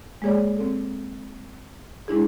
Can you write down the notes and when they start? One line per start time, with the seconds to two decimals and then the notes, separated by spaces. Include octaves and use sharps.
0.22 G#3 A#3 G#4 C#5 D5
0.57 C4 A4
2.08 G#3 D4 E4 G#4